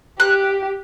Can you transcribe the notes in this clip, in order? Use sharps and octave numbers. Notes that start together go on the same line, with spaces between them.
G4 F#6